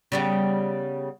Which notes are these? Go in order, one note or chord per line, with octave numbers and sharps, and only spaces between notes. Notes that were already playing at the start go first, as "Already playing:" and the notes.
C#3 G3 B3